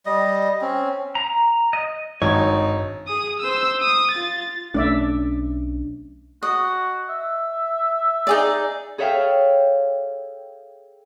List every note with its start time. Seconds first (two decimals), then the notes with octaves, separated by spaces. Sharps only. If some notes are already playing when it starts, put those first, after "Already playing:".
0.06 G3 D#5
0.61 C4 C#4
1.15 A#5
1.73 D#5
2.22 G#1 G2 D#4 C#5
3.07 G#4 D#6
3.40 C5 E6
3.81 D#6
4.11 F4 A6
4.74 B1 A3 C#4 D4 D5 E5
6.43 F#4 D#5
7.09 E5
8.27 D#4 G#4 D5
8.98 G#4 A4 C#5 E5 F5 G5